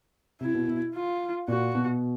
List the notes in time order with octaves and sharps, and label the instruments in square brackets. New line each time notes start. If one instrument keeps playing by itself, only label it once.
[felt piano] C3 [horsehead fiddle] E4
[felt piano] B2
B2
[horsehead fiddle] F4
[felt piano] A#2 [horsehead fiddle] F#4
[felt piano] B2